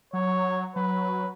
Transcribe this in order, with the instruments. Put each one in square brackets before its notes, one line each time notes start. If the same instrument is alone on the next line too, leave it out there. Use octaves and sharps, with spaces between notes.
[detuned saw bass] F#3 [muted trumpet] C#5
[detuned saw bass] F#3 [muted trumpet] B4